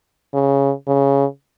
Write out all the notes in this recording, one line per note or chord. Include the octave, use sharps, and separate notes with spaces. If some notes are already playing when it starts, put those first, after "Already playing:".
C#3
C#3